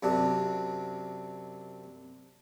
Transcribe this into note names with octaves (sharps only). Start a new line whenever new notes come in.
F#2 C3 D4